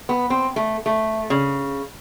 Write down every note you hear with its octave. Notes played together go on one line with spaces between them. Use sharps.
B3
C4
A3
A3
C#3